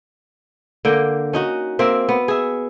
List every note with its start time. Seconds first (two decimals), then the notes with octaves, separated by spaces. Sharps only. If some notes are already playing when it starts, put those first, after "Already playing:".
0.85 D3 A#3 G5
1.33 C#4 D#4 F#4
1.79 A#3 C4 E5
2.09 B3
2.28 G#4 E5